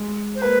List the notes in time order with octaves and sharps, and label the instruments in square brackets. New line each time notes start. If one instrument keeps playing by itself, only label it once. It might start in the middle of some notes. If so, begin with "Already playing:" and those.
Already playing: [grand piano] G#3
[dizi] C5
[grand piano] A#3 [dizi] B4